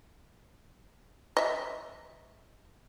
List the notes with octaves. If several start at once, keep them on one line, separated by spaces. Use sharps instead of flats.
D#5 E5